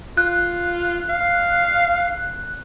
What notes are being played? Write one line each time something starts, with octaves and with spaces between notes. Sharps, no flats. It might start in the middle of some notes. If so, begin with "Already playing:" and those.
F4 F#6
F5